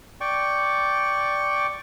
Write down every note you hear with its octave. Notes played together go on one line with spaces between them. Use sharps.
D5 G5 C#6